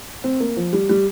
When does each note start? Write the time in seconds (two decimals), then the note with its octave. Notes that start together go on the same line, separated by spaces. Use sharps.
0.24 C4
0.40 A#3
0.57 F3
0.73 G3
0.89 G3